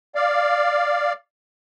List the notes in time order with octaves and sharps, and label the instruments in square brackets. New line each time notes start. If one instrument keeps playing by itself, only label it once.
[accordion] D5 F5